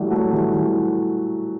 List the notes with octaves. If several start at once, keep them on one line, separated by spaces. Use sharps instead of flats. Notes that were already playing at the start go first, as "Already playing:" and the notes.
Already playing: E3 F#3 G3 A3
F#3 A3
E3 G3
E3 G3